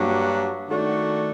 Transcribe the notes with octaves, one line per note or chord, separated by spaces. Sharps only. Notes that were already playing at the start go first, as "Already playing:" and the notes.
Already playing: G2 F#3 A#3 D4 F#4
D#3 A3 D4 F#4